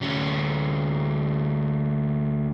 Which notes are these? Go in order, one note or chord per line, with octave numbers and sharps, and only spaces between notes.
D2 C#4